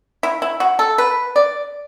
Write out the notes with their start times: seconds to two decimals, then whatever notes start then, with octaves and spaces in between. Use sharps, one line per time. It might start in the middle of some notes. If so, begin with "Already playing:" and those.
0.23 E4
0.42 E4
0.60 F#4
0.79 A4
0.98 B4
1.36 D5